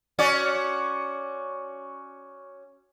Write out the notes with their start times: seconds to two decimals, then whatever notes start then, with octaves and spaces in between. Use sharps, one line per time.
0.19 C#4 F#4 D5